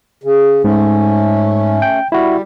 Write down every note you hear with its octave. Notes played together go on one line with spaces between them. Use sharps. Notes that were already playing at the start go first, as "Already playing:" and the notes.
C#3
G#2 A3 C#4
G5
G3 E4 F#4